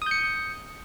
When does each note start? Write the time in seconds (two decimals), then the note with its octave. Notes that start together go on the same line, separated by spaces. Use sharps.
0.02 D#6
0.06 G6
0.11 C#7